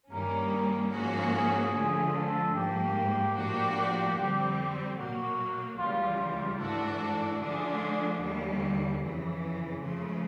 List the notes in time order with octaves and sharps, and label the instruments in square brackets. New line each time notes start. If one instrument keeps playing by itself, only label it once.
[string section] G2 D#3 G3 A#3 C#4 [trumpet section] A#4
[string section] G#2 F3 A#3 C#4 F#4 [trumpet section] G#4
[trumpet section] G#4
[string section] D3 F3 A3 [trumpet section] G#4
[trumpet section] A4
[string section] G#2 F3 A#3 [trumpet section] G4
[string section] A2 F3 A#3 D4 F#4
F2 D3 G3 C4
[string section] B2 F#3 A#3 [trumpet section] F#4
[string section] C#2 C#3 E3 G3 [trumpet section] F4
[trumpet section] F4
[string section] G#2 E3 A3 D4 F#4 [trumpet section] A4
[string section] D3 F3 A3 D4 [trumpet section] G#4
[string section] D#2 D3 G3
F2 C#3 E3
C#3 F3 A3